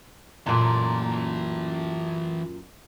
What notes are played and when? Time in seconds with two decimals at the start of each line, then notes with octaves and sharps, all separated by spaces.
0.46 F#2 A#2 E3 A4